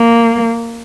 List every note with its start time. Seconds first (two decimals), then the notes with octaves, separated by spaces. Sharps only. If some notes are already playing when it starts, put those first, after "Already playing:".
Already playing: A#3